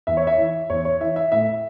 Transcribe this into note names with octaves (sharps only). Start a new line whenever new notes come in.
E2 E5
C#5
E5
E3
E2 C#5
C#5
E3 E5
E5
A2 E5